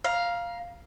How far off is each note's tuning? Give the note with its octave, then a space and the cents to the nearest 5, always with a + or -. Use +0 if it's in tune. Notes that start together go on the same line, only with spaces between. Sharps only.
F5 +0 A#5 +25